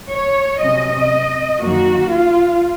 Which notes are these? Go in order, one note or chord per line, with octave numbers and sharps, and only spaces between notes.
C#5
C3 F#3 C#4 D#5
F#2 D#3 F#3 A#3 F#4
F4